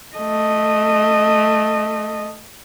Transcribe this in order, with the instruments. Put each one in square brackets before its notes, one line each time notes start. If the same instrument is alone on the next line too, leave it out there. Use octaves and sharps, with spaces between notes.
[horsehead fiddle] A3 D#5